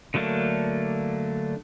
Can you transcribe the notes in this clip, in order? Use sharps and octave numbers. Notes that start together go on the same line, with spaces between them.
D3 F#3 A3 A#3 D4